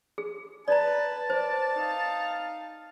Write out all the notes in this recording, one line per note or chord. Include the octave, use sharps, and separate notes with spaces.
G#4
B4 D5 A5 A#5
C5 D5
D#4 F5